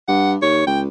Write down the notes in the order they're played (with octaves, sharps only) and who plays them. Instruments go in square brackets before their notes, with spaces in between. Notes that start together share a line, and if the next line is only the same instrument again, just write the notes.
[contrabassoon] G2 [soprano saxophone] F#5
[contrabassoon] D#2 [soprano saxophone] C#5
[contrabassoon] C#2 [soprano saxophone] G5